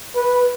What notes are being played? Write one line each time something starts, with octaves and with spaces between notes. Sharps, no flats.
B4